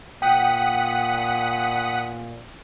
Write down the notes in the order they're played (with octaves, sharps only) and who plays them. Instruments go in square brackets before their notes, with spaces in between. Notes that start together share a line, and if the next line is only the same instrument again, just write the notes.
[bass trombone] A#2 [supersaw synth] F#5 D#6 B6 [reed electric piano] G5